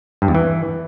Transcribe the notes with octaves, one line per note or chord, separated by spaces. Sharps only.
G2
E2
E3